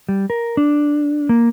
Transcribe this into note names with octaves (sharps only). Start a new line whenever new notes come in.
G3
A#4
D4
A#3